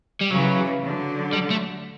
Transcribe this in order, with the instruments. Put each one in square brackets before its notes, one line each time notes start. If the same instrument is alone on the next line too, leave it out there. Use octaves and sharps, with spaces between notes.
[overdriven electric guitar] G3
[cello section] C#3 E3 [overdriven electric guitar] F#3
[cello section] D3 F#3
[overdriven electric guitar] G3
A3